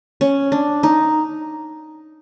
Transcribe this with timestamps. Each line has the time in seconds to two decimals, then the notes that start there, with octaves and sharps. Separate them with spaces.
0.21 C#4
0.52 D4
0.83 D#4